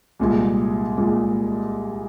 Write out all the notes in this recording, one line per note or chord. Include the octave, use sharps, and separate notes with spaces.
C2 A#2 G#3
A#2 G#3